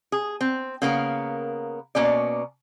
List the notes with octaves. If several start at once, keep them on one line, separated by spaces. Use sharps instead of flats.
G#4
C4
C#3 A#3 B3 A#4
B2 A#3 C#4 D5